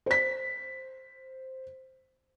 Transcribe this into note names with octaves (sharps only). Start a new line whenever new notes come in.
C5 B6